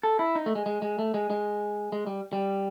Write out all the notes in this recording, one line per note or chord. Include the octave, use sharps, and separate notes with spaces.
A4
E4
D#4
A3
G#3
G#3
G#3
A3
G#3
G#3
G#3
G3
G3